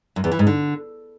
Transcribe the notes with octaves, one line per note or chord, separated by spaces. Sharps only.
F#2
E2
E3
G#2
D3